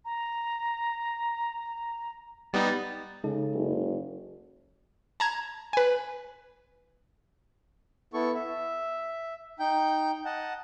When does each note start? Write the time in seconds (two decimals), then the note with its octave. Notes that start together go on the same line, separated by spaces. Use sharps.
0.05 A#5
2.53 G3 B3 D#4 A6
3.24 C#3 G#3 D#4 A4
3.55 F#1
5.20 A5 A#5 G#6
5.73 B4 G#5
8.14 B3 E4 A4 C#6
8.35 E5
9.60 D#4 G5 G6
10.25 D#5 F#5 A5